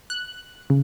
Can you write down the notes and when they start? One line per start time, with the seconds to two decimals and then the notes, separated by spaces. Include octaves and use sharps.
0.10 F#6
0.70 C#3